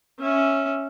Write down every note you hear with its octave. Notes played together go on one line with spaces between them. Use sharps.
C#4 E5